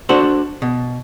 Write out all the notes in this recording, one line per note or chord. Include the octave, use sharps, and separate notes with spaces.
D4 F#4 A4 C5
B2